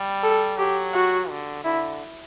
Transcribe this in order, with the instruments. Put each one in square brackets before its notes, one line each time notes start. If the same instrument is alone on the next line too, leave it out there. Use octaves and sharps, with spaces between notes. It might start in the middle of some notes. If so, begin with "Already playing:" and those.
Already playing: [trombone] G3
[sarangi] A4
[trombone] F#3 [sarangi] G4
[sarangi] F#4
[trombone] D3
[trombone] D3 [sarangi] E4